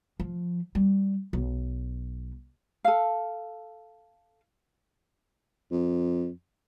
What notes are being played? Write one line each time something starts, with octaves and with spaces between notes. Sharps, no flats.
F3
G3
B1
A4 F5
F2